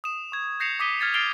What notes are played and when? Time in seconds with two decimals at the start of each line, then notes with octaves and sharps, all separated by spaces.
0.04 D#6 E7
0.32 C#6 G#6
0.60 G6 A#6 C7 C#7 E7 F7
0.80 D6 D#6 B6 D#7 G7
1.00 F6 G#6 A6 C#7
1.14 F6 A6 C7 D7 F7 G7